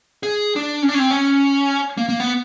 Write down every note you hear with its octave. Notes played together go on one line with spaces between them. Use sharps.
G#4
D4
C#4
D4
C#4
C4
C#4
A#3
A#3
B3